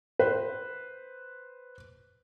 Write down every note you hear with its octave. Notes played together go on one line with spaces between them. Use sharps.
B4 C5